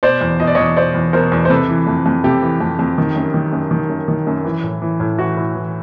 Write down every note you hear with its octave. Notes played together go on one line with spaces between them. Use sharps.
B2 C5 D5
E2
B2 D#5
D5
E2 C#5 D#5
B2 C5 D5
E2
B2 A#4 C5
E2
C5
C3 A4 B4
E3
F2
F2
C3 G4 A4
E3
F2
F2
D#3
F#2
D#3
F#2
D#3
F#2
D#3
F#2
E3
A2
E3
A2
E3 F#4
A2
E3